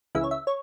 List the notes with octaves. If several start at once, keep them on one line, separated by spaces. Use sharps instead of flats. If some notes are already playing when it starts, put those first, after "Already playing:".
C#2 C#3 E3 E5
C#5
E5
C#5